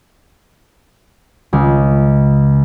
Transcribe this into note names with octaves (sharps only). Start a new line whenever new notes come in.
C#2